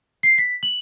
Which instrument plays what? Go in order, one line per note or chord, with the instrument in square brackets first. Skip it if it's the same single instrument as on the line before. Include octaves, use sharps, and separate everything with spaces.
[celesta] C7
B6
F#7